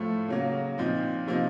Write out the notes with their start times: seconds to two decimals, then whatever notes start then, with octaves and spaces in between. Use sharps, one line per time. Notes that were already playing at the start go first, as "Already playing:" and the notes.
Already playing: A2 F3 A3
0.28 C#3 F#3 A#3
0.78 A#2 F3 C4 D#4
1.28 C3 F3 A#3 D#4